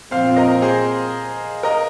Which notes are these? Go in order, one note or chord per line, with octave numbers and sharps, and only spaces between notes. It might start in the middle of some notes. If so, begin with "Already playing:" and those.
A#2 F3 C4 C5 F5
A#4 D#5
G#4 C5
A#4 D#5